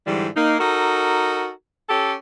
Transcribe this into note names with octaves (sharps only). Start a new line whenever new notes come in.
G#2 D3 E3 G3
A#3 D#4
D#4 F#4 A4 A#4
C#4 G4 A4